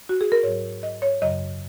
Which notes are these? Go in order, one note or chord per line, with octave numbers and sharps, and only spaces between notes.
F#4
G#4
A#4
G#2 F#3 C#5
D#5
C#5
F#2 C#3 F#3 D#5